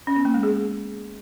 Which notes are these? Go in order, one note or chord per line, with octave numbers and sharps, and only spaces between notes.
C#4
B3
A#3
G#3
G#4